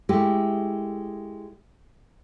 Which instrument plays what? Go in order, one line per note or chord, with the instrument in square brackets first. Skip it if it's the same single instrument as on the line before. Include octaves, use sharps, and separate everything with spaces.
[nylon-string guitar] G#3 A3 E4 G4